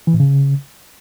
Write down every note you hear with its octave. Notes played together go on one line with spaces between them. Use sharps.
E3
A2
C#3